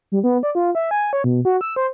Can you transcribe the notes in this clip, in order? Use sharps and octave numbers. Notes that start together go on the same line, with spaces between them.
G3
B3
D5
F4
E5
G#5
C#5
B2
F#4
E6
C5